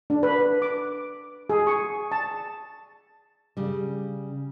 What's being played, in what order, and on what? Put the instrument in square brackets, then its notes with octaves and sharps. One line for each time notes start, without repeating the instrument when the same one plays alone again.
[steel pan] D4
B4
D6
G#4
C#6
A5
[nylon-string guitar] C#3 G3